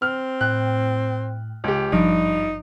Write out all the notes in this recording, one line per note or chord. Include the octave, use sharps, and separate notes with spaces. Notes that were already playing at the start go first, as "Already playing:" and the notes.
C4 F6
A2 G5 F#6
C#2 G4
G#1 G2 F3 D#4 D7